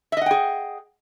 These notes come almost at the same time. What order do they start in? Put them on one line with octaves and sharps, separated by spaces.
E5 D#5 F#5 G5 G#4